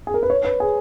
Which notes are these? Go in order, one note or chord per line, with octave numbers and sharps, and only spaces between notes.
G#4
A#4
B4
C#5
B4
G#4